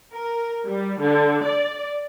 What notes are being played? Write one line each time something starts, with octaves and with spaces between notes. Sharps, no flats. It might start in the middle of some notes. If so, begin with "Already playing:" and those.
A#4
G3
D3
D5